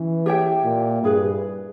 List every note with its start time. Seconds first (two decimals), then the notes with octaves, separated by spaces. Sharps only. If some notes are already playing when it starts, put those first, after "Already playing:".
Already playing: E3 C#4 B4
0.26 G4 C#5 E5 G5
0.65 A#2
1.04 G2 E4 G#4 B4